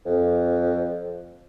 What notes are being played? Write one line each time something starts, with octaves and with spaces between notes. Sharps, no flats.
F2